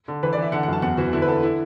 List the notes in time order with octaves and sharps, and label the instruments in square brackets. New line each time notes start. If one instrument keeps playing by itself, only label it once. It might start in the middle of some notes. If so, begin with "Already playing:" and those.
[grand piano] D3
E3 B4
D5
E3 E5
D3 F#5
F#5
F#2 A5
E2 F#5
E3 F#4
D3 E4
B4
D3 A4
E4